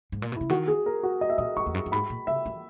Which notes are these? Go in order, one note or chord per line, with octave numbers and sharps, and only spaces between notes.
G#2
A#2
B2
C#3 E4
D#3 F#4
G#4
A#4
F#4
D#5
E5
A#2 D#5
F#2 C#6
E2
F#2
F#2
G#2 B5
A#2
C#3 E5
E3